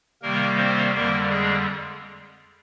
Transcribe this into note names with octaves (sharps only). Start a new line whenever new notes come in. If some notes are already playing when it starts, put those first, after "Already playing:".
C3 D#3 G3 A#3 A#4
C4 C5
F2 D3 G3 A#3 A#4
G#3 G#4